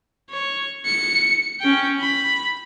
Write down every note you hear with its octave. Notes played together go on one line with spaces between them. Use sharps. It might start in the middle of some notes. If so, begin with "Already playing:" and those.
C#5
C#7
C#4 G5
B5